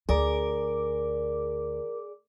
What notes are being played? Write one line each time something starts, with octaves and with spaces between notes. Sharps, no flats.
D2 G#4 A#4 D5 D6